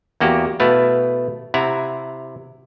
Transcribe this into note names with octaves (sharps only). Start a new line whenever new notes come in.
E2 A#3 F#4 G4
B2 A3 E4 B4 F5 F#5
C3 E4 F#5 A#5